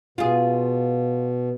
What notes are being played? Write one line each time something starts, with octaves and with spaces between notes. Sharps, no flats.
B2 F4 G#4